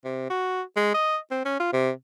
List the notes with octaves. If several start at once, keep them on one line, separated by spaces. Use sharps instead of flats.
C3
F#4
G#3
D#5
C4
C#4
F4
C3